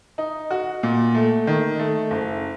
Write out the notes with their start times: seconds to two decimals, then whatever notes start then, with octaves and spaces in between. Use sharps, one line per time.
0.18 D#4
0.51 F#4
0.83 A#2
1.15 A3
1.47 D#3
1.79 A3
2.11 F#1